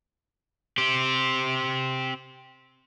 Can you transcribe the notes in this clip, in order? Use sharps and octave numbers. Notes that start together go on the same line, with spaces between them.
C4 G4